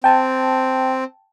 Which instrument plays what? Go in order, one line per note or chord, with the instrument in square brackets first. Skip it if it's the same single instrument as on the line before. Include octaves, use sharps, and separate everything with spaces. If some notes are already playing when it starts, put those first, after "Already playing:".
[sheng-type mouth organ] C4 [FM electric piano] G5 A5